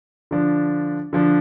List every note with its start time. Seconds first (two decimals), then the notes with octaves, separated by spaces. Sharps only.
0.31 D3 F3 D4
1.13 D3 F3 D4